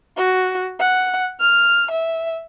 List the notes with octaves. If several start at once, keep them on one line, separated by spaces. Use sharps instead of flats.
F#4
F#5
F6
E5